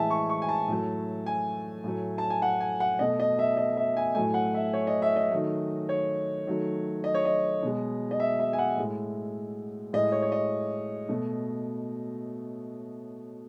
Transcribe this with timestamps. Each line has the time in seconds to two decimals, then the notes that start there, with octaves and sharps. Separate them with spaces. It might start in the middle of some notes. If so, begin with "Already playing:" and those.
Already playing: A2 E3 G#3 E5 G#5 A5
0.10 C#6
0.29 C#6
0.42 G#5
0.49 A5
0.68 A2 F#3 A3
1.26 G#5
1.84 A2 F#3 A3
2.18 A5
2.30 G#5
2.42 F#5
2.61 G#5
2.80 F#5
2.99 B2 A3 D#5
3.20 D#5
3.39 E5
3.57 D#5
3.77 E5
3.97 G#5
4.15 A2 F#3 A3 G#5
4.34 F#5
4.54 E5
4.73 C#5
4.87 D#5
5.02 E5
5.16 D#5
5.31 D#3 F#3 A3
5.89 C#5
6.47 D#3 F#3 A3
7.04 D#5
7.14 C#5
7.25 D#5
7.63 B2 G#3
8.11 D#5
8.20 E5
8.40 E5
8.53 G#5
8.59 F#5
8.77 A2 G#3
9.93 A2 G#3 D#5
10.12 C#5
10.22 C#5
10.32 D#5
11.09 B2 A3